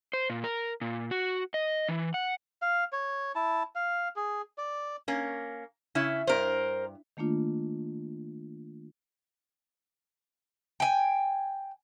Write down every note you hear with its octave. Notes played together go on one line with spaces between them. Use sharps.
C5
A#2
A#4
A#2
F#4
D#5
E3
F#5
F5
C#5
E4 A5
F5
G#4
D5
A#3 C#4
C#3 C#4 E4
G2 A#4 C5
D#3 A3 A#3 D4 F4
G5 G#5